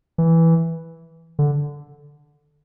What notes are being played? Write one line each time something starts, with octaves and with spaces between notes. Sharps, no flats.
E3
D3